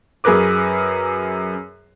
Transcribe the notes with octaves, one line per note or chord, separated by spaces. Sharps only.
F#2 G#4 A#4 B4 D6